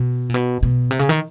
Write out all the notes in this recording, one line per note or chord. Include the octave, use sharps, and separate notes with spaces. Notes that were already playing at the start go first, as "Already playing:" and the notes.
Already playing: B2
A#2
B2
B2
C3
C#3
D#3